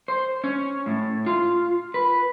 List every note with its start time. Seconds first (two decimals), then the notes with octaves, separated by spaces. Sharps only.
0.08 C5
0.44 C#4
0.86 A2
1.26 F4
1.94 B4